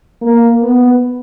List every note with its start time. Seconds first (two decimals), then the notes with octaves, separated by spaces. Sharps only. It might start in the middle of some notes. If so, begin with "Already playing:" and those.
0.22 A#3
0.63 B3